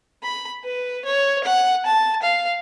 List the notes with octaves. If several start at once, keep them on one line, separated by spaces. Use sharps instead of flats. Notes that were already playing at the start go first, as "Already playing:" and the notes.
B5
B4
C#5
F#5
A5
F5